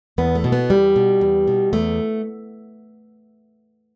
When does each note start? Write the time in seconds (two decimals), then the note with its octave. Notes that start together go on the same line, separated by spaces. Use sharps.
0.18 E2 B3
0.35 A3
0.44 B2
0.52 B3
0.70 E2 G3
0.96 B2
1.21 E2
1.48 B2
1.73 E2 A3